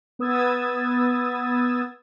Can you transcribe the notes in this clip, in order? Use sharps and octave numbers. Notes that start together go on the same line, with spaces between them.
B3 B4 D#6 E6 G#6 A6